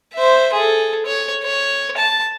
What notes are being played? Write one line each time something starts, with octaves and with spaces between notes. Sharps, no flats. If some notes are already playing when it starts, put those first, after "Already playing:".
C5 E5
G#4 A4
C#5
C#5
A5